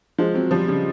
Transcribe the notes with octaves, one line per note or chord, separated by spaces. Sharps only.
F3 G#3
F#3 C4
F3 G3
C#3 G3